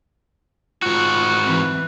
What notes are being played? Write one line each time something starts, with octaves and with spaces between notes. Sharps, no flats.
G#2 F4 F#4 F#6
E3 C4